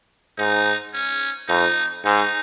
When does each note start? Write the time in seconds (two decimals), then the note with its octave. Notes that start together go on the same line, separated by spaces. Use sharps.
0.38 G#2 D#4
0.94 C#4
1.48 F2 D#4
2.04 G#2 D#4